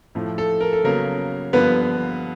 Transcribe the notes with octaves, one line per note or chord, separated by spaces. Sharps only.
A2 F3 A3
A4
A#4
A4
C#3 F#3 A#3 B3 A#4
G2 D3 F3 A#3 B3 B4